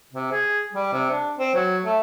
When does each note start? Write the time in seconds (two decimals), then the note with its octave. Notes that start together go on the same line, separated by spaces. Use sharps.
0.13 C3
0.32 G#4
0.74 G3
0.93 C3
1.11 D4
1.38 C4
1.55 F#3
1.85 A3